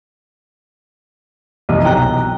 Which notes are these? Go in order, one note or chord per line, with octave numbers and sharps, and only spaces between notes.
C2 F2 E3 D#5
B1 G5 A#5 F#6